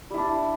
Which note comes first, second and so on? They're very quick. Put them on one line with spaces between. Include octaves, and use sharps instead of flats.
G3 E4 D4